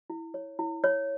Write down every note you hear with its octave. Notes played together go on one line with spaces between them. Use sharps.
E4
C#5
E4
C#5